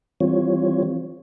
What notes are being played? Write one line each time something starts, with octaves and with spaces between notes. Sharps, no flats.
E3 G3 C4 F4 C#5